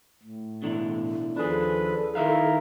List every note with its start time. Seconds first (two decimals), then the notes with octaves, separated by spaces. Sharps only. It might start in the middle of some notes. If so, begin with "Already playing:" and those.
0.23 A2
0.62 B2 D3 E3
1.36 D#2 F3 D4 G#4 A4 B4
2.15 D#3 E4 A#4 E5 F5